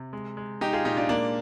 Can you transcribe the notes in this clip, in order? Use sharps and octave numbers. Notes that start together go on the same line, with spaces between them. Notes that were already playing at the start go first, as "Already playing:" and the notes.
Already playing: C3
G#3
G#3
G#3 D#4 G4
F4 G#4
A#2 D#4 G4
D4 F4
G#3 A#3 D4